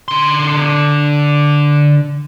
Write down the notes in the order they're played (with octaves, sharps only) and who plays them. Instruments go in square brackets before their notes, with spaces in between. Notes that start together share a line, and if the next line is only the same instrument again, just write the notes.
[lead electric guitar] D3 C6